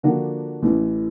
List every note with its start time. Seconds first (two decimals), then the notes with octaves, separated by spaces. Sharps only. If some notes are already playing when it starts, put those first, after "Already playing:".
0.03 D3 F3 A#3 D4 F#4
0.63 A1 A2 E3